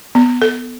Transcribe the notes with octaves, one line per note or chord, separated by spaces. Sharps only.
B3
A4